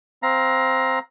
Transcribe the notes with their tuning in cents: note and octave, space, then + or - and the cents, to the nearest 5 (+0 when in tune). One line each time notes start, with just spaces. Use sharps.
C4 +0 F5 +0 A#5 +15